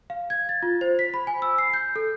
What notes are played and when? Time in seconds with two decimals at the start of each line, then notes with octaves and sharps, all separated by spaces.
0.10 F5
0.30 G#6
0.49 A6
0.62 F4
0.81 C5
0.99 B6
1.14 B5
1.27 G#5
1.42 E6
1.58 C7
1.74 G6
1.96 A4